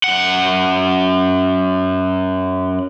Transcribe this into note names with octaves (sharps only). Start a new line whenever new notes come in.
F#2 F#5